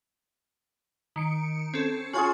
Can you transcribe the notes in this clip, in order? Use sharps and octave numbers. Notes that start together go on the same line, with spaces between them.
D#3 C#7 D7
C4 C#4 A4
C#4 F4 F#4 G#4 G#5 C6